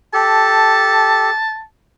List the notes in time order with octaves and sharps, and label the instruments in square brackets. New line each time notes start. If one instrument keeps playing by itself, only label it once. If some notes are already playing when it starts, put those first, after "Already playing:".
[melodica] G4 A4 [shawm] A5